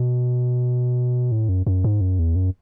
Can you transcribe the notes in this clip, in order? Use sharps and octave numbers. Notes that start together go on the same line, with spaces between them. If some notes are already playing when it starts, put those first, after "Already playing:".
Already playing: B2
A2
F#2
F#2
G#2
F#2
E2
F#2